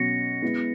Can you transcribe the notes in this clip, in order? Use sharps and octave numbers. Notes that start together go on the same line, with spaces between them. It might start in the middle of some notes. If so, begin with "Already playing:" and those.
Already playing: B2 F#3 C#4 F#4 A#6 C#7
G#3 B3 E4